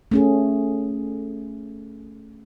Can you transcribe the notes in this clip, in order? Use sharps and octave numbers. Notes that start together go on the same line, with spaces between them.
A3 C#4 G#4